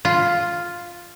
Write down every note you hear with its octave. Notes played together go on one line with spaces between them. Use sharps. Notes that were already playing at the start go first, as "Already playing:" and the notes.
F4